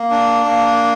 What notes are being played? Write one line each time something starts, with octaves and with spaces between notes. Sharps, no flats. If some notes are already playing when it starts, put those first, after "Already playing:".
Already playing: A#3
D4
A#3